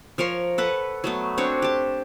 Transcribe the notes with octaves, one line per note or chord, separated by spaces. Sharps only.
F3 A#4 C#5 C6
A4 B4 F#5
F#3 A3 B3
C4 D4 F#4 C#5
G4 A5